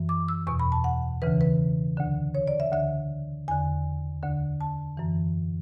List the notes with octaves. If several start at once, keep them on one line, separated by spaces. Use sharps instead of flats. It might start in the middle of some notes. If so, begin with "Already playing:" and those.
Already playing: F#2 E3
D6
E6
E2 B2 C#6
B5
A5
F#5
D2 C#3 E3 B4
B4
D2 D3
C#5
D5
E5
D2 D3 E5
E2 D3 G#5
D2 D3
A5
F#2 E3